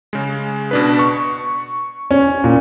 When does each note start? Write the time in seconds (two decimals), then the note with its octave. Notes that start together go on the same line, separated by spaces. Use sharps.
0.13 C#3 G#3
0.71 B2 D4 B4
0.99 C#6
2.11 C#4
2.44 A#2